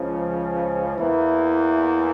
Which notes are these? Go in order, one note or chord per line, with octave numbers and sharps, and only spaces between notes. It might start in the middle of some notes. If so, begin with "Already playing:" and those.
Already playing: C#2 C#3 F3
E2 E3 A#3 E4